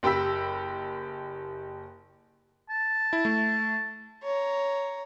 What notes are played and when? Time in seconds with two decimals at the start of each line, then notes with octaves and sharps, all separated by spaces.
0.03 F#1 G4 G5 B5 E6 B6
2.70 A5
3.13 E4
3.25 A3
4.23 C#5 A#5